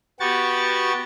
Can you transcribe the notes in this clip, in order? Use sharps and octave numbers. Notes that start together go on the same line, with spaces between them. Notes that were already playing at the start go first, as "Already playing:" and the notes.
B3 F#4 G4 C#6 A6